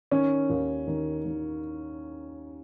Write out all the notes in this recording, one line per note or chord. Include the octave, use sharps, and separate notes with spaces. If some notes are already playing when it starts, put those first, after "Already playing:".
D#3 C#4
D#2
D#3
D#3